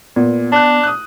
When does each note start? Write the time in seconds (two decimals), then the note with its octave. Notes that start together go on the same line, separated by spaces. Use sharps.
0.16 A#2 B3
0.52 D4 A5 F#6
0.83 D#6 F#6